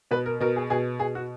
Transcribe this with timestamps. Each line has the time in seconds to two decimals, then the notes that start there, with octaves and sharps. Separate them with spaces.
0.11 B2 B4
0.26 A#4
0.40 B2 A#4
0.56 G#4
0.70 B2 G#4
1.00 B2 G#4
1.15 F#4